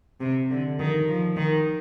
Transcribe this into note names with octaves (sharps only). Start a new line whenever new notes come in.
C3
D3
D#3
F3
D#3